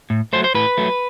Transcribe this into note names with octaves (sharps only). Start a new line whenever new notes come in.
A2
F#3 A3 C5
C5
A2 B4
F#3 A3